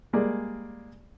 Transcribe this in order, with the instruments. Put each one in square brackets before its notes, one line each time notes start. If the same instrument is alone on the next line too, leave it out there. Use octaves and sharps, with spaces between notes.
[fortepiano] G3 G#3 A#3 G#4 D5